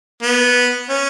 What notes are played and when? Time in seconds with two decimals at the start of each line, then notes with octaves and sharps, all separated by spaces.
0.23 B3
0.89 C#4